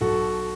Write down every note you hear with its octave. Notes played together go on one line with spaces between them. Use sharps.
B1 F#4 A4